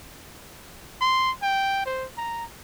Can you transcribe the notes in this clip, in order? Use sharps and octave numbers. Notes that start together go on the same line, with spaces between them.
C6
G5
C5
A#5